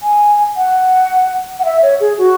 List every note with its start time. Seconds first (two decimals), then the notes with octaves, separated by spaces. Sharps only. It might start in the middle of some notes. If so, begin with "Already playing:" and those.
0.03 G#5
0.57 F#5
1.59 F#5
1.65 E5
1.82 C#5
2.00 G#4
2.18 F#4